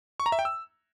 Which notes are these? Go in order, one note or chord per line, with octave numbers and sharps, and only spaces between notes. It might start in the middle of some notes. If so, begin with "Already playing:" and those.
C#6
A#5
E5
G5
E6